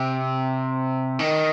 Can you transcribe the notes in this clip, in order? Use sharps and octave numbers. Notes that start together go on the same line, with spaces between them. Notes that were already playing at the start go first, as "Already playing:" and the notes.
Already playing: C3
D#3